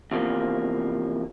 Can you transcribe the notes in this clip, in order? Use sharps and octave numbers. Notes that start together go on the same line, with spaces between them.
E2 C3 F3 A#3